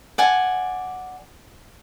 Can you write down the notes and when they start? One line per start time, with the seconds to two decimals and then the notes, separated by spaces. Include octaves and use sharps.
0.18 D5 F#5 G#5